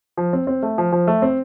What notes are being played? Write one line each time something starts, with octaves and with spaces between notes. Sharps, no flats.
F3
C4
C4
A3
F3
F3
A3
C4